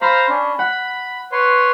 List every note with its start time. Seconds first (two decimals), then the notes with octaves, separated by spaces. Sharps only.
0.01 C5 F5 A#5 B5
0.29 C#4 D4
0.59 F#5 B5
1.32 B4 C#5 C6